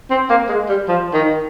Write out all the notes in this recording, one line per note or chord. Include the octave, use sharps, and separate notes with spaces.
C4
A#3
G#3
G3
F3
D#3